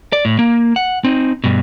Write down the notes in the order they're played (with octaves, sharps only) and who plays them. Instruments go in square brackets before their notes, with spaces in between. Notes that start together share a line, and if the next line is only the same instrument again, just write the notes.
[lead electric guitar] D5
A2
A#3
F#5
C4 D#4
G2 B2